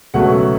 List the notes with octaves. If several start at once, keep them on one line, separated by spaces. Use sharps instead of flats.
C#2 B2 F#3 A3 F#5